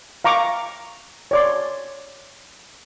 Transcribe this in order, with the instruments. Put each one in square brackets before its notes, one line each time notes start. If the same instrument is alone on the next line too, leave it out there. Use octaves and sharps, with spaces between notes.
[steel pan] F5 A#5 C#6 D6
C#5 D5 C6